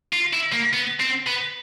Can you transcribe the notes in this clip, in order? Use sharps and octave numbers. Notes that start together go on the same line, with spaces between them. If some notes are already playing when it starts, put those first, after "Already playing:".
F4
E4
A#3
B3
C4
B3